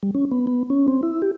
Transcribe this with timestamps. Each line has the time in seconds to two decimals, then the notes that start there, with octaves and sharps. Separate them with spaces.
0.03 G3
0.14 C#4
0.31 B3
0.47 B3
0.70 C#4
0.88 C4
1.03 E4
1.22 G4